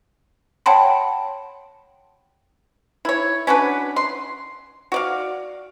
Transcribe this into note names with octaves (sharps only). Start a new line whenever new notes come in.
C#5 F#5 G5 A5 B5 C6
E4 C#5
C#4 D4 F#4 B4
C6
F#4 D5 F5